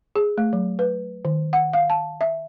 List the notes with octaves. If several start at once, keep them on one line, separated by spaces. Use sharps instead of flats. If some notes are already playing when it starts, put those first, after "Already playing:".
G#4
A3
F#3
B4
D#3
F#5
F5
A5
E5